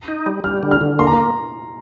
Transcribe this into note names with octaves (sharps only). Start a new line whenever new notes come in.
D#4
G3
G3 F6
D3
F6
D3
A#3 C6
A#5